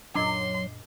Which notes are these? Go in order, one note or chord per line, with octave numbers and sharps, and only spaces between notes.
F#2 A#2 F#3 D4 A#4 D#5 C6 D6